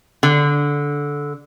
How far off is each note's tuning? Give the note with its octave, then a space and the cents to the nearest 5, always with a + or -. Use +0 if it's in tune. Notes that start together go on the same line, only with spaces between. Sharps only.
D3 -15